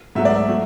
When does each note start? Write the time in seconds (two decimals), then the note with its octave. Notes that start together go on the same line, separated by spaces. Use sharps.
0.15 G#2 F#3 A3 E5
0.25 D5
0.35 E5
0.49 F#3 A3